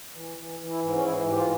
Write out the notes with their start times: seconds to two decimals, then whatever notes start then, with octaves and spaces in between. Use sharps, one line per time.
0.14 E3
0.37 E3
0.59 E3
0.70 E4
0.82 G#2
0.95 C#4
1.04 E3 E4
1.27 G#2 G4
1.38 F4